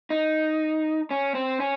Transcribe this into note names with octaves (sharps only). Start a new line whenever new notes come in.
D#4
C#4
C4
C#4